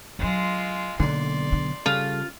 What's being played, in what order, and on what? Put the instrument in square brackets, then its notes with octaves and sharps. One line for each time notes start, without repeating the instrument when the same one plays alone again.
[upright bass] F#3 D4 [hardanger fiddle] G#3 F4
[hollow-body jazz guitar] B1 D3 [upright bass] A#3 [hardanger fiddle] D5 C6
[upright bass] D4
[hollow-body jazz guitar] C#3 G3 A4 [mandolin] F4